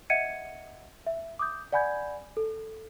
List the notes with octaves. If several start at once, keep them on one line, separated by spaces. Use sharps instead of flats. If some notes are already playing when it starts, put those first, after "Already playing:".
D#5 E5 F#5 G#6 C#7 D#7
E5
D6 D#6 G6
D5 F#5 G#5 B5 G6 G#6
A4